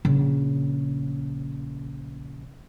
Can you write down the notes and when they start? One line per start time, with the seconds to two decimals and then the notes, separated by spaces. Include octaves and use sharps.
0.05 A#1 C#3